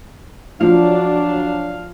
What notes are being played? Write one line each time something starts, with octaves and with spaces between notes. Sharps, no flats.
F3 F#3 D4 F5